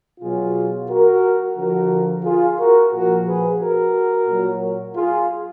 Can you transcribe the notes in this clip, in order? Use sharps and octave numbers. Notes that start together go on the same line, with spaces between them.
B2 F#3 F4 G#4
F#4 A#4
D3 F3 F#4 A#4
F4 G#4
F#4 A#4
A#2 F3 F#4 A#4
G#4 B4
F#4 A#4
A#2 F#3
F4 G#4